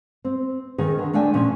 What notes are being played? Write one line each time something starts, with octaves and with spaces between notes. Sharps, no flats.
C4
D#3 C#4 G#4 A#4 B4
D3
A3 D4 D5 G5 G#5
A#2 F3 C#4